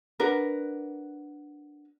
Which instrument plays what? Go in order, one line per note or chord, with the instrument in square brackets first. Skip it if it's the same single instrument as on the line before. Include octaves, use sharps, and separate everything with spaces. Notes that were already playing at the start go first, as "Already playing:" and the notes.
[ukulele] D4 F#4 A#4 B4